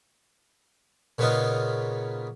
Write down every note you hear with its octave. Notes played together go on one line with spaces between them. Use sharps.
A#2 C#3 B3 C#4 D#4 F4